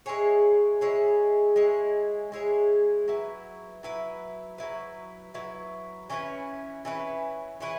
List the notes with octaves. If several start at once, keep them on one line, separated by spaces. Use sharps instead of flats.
G#3 E4 G#4 C#5
G#3 E4 G#4 C#5
G#3 E4 G#4 C#5
G#3 E4 G#4 C#5
F#3 E4 B4
F#3 E4 B4
F#3 E4 B4
F#3 E4 B4
E3 C#4 E4 B4
E3 C#4 E4 B4
E3 C#4 E4 B4